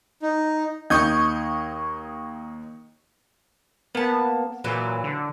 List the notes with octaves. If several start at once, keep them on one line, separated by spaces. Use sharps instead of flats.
D#4
D#2 D#4 C#6 D#6 G6 G#6
A#3 B3 A5
A#2 E3 F#3
D3